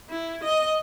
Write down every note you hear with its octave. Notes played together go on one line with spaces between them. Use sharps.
E4
D#5